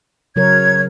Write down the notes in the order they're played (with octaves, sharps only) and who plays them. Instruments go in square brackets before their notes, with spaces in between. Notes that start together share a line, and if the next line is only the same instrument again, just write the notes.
[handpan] C#3 F#3 A#4 [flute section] C#5 G#6